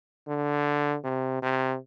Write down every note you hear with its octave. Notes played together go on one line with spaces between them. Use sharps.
D3
C3
C3